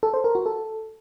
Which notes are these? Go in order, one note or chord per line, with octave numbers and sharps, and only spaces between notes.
A4
C5
A#4
F#4
A4